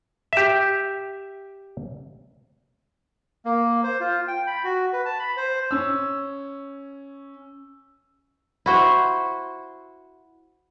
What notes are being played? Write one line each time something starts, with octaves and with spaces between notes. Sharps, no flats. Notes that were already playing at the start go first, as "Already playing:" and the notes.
G4 E5
A#3
C5
F4
G5
B5
F#4
B4
A5
B5
C5
C#4 E6
E4 F#4 C5